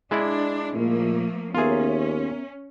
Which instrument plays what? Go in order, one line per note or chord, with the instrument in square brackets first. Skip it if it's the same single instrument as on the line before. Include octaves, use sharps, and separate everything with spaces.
[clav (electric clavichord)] G#3 E4 D5 [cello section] D4
[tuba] A#2 [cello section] F3 A3 A#3
[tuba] D#2 [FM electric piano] B3 A#4 E5 [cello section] C#4 [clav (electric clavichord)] F4 G#4